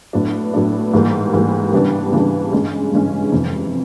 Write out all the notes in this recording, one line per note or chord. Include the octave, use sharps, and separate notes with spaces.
A2 F#3 B3 D4
A2 F#3 B3 D4
G#2 E3 G3 A#3
G#2 E3 G3 A#3
C#3 E3 G3 B3 D4
C#3 E3 G3 B3 D4
G2 E3 G#3 C#4
G2 E3 G#3 C#4
F2 C3 E3